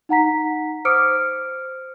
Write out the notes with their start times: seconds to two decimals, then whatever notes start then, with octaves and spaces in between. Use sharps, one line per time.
0.09 D#4 F#5 A#5 B6
0.85 C5 D6 D#6 F6 C#7 D7